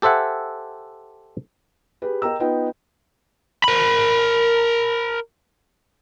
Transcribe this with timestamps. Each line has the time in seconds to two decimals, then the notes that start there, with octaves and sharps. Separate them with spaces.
0.02 G4 A4 C5 E5 F#5 G#5
2.02 G4 G#4 B4
2.22 A#4 D#5 G5 A#5 E6
2.40 B3 D#4 F4 B4 G5
3.64 A#4 B5